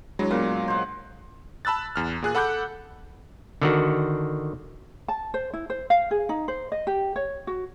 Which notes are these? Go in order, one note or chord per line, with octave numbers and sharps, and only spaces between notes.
F#3 G#3 D4 E4 C#5
A#2 B3 D4 A#4
C5 F#5
A5 B5 E6 F#6 A6
E2 F6
A#2 G#4 F#6
A4 F#5 B5 D6 F#6 G6
D3 D#3 F#4
A5
C5
E4
C5
F5
G#4
D#4
C5
D#5
G4
C#5
F#4